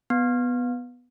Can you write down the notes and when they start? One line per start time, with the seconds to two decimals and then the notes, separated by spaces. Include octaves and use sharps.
0.10 B3